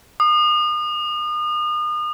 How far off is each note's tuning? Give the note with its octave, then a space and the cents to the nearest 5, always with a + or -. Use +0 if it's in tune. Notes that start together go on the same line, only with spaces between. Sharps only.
D#6 -35